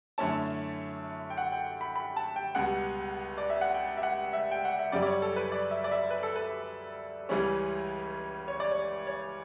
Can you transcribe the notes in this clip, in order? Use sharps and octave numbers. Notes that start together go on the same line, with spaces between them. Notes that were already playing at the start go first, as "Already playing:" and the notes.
F#2 D3 A3 C#4 E4 A5
G5
F#5
G5
B5
B5
A5
G5
C#2 B2 G3 F#5
D5
E5
F#5
G5
E5
F#5
E5
G5
F#5
E5
F#2 C#3 G3 D5
D5
C#5
A4
B4
D5
E5
D5
E5
B4
A4
B4
C#2 C#3 E3 G3 C#4
C#5
D5
C#5
C#5